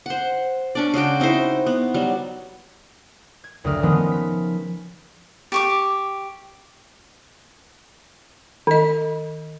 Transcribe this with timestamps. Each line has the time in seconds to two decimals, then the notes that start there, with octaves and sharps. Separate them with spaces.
0.06 C5 F#5
0.75 C#4 D4 D5
0.94 C#3 G#3 F#4 G5
1.20 C4 D#4 E4 C5
1.66 B3
1.94 F#3 G3
3.44 G#6
3.64 F#1 D2 A3 A#4 D#6 F6
3.83 D#3 F3 G#3 B3 C#4
4.12 B6
5.52 G4 C#6 D6
8.67 D#3 D#5